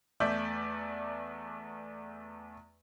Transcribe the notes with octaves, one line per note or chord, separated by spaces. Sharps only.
E2 A3 D5 E5 G6